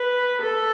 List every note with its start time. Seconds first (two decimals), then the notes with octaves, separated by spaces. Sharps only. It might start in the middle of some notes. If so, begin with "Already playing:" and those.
Already playing: B4
0.42 A4